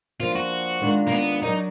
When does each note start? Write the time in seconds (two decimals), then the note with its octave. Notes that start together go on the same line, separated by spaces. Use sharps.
0.20 F3 A#3 D4 F4
0.35 F#4
0.81 D#3 G#3 D4 F4 A#4
1.07 A#3
1.12 B3
1.42 F#3 D4 D#4 F#4 A#4 D5